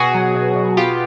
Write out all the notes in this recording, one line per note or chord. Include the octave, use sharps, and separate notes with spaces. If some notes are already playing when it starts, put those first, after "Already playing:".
Already playing: B2 F#4 G#4
F#3
B2
B2
B3 F4 G4